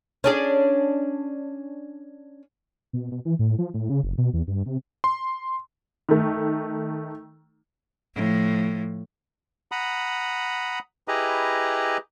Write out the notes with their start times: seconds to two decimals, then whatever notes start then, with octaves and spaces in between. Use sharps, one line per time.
0.24 C#4 D4 G#4
2.93 B2
3.11 B2
3.25 E3
3.39 A2
3.58 F3
3.74 A2
3.90 C#3
4.04 F#1
4.18 B2
4.33 E2
4.47 G2
4.66 C3
5.04 C6
6.09 D#3 A3
8.15 A2 F3
9.72 F#5 A#5 B5 D#6
11.08 E4 G4 G#4 B4 D#5 A#5